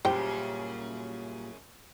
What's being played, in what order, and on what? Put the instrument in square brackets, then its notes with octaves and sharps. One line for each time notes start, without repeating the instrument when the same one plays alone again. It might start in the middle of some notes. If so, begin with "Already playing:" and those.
[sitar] F#2 C#3 [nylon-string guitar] A#2 G3 G4 [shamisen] C5 G5